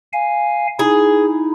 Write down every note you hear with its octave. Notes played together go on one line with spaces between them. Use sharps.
F5 G#5
D#4 E4 G#4